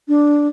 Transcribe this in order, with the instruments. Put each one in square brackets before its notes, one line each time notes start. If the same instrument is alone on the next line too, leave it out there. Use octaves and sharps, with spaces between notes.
[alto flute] D4